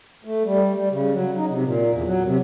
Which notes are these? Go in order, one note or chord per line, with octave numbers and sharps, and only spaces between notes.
A3
G3
G3
C#3
F#3
D#4
C3
A#2
E2
F#3
C3